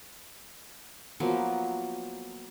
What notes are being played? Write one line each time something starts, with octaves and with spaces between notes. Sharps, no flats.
F3 F#3 A#3 B3